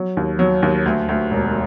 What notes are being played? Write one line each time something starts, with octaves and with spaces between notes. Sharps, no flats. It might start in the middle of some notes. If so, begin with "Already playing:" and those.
Already playing: F#3
D#2
F#3
D#2
D2
D2
E1